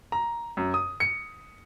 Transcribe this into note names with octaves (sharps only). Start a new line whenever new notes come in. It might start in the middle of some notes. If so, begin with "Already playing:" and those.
A#5
F#2
D#6
C#7